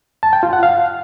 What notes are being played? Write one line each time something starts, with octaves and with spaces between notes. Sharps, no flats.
A5
G5
F4
F#5
F5